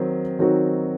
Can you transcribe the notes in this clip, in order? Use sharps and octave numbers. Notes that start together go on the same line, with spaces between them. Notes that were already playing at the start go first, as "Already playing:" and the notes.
Already playing: D#3 F#3 C4
D#3 F#3 C4 D#4 F#4